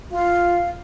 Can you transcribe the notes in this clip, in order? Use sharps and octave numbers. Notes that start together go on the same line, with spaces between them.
F4 F5